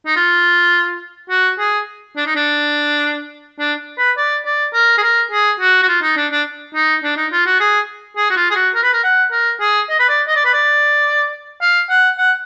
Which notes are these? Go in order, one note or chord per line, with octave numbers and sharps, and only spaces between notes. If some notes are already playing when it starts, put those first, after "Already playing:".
D#4
F4
F#4
G#4
D4
D#4
D4
D4
B4
D5
D5
A#4
G#4
A#4
G#4
F#4
F#4
F4
D#4
D4
D4
D#4
D4
D#4
F4
F#4
G#4
G#4
F#4
F4
G#4
F#4
A#4
B4
A#4
F#5
A#4
G#4
D#5
B4
D5
D#5
D5
B4
D5
F5
F#5
F#5